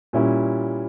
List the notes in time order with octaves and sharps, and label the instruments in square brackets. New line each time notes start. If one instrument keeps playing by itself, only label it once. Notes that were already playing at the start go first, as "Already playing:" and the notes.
[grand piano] A#2 G3 C#4 E4